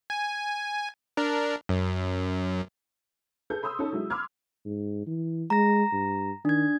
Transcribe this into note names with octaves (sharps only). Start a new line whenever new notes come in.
G#5
D4 A#4
F#2
G#4 A4 B4 G6
B5 C6 D#6 E6 G6
C#4 D#4 A4
F#3 G#3 E4
B5 C6 D6 E6 F6 G#6
G#2
E3
G#3 A#5 A#6
G2
D#3 D4 G#6